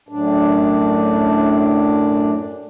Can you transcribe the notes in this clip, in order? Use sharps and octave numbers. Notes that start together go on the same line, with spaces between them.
F#2 A2 D4